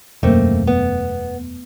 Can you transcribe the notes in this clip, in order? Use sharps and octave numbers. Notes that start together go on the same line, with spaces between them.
E1 F#2 A3 A#3 C4
B3